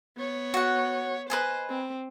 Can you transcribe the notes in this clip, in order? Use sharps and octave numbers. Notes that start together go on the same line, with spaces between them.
B3 C#5
F#4 F#5
B4 C5 D#5 G#5
C4